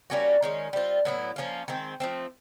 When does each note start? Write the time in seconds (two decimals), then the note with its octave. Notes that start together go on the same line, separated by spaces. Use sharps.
0.10 G3 A#3 C#4 F#4
0.42 D#3 G#3 C#4
0.73 G3 C4 F4
1.05 A2 F#3 B3 E4
1.36 F3 A#3 C#4 F4
1.68 D#3 G#3 C4
2.00 F3 A3 C4